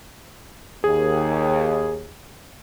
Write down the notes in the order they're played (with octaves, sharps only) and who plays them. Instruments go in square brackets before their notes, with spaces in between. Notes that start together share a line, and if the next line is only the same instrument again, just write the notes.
[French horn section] D#2 [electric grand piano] G#4